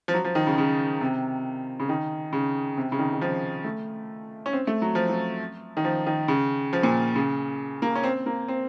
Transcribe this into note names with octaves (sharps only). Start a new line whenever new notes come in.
F3
F#3
F3
D#3
C#3
C#3
C3
C#3
D#3
C#3
C3
C#3
D#3
D#3
F3
A3
C#4
C4
A3
F#3
F3
F#3
D#3
F3
D#3
C#3
F3
A#2
C#3
A#3
C#4
C4
A#3
C4